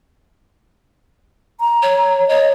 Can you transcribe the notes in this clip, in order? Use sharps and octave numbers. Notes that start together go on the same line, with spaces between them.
A#5
C#5
C#5 D#5